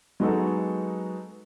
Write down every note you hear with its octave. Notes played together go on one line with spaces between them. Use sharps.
F#3 G#3 B3 D#4 F#4 A4